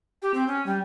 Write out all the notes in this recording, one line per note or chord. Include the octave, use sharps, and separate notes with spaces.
G4
C4
C#4
G3